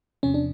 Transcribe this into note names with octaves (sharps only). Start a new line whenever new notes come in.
E2 C3 F3 C#4
D4